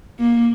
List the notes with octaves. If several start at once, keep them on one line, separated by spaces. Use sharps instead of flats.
A#3